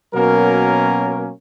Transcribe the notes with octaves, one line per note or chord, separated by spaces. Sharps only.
B2 F#3 A#3 C#4 A#4